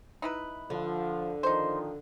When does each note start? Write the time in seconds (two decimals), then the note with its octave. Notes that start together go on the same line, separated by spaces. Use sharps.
0.22 D#4 E4 B4
0.70 D3 F3
1.43 D#3 F3 D#4 C5